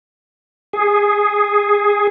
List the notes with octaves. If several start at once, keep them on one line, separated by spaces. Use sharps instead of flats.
G#4